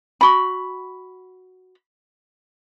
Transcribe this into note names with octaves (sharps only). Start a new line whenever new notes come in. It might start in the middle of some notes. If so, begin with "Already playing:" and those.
F#4 B5